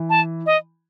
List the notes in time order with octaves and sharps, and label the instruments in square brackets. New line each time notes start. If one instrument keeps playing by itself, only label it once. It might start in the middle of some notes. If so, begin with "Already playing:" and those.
Already playing: [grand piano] E3
[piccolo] A5
D#5